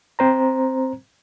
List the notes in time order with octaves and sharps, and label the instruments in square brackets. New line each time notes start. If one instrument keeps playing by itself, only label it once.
[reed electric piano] C4 C5 A#5